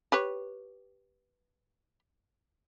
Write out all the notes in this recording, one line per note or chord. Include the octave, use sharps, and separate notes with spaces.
G4 B4 C#5